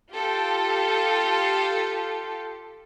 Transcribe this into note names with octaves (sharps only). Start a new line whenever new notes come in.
F4 G4 A4